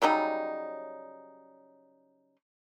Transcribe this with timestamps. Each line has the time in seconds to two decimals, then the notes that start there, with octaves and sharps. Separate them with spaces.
0.02 C#3 F#3 G3 D#4